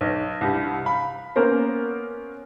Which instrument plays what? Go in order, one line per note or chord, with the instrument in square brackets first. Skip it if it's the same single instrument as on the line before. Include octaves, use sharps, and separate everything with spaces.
[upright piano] B1
C2 G2
F5 B5
A#3 B3 C#4 A#4 C5